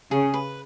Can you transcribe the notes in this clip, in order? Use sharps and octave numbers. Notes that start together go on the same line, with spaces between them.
C#3 G#4
B4